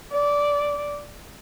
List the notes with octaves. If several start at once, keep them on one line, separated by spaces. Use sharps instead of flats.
D5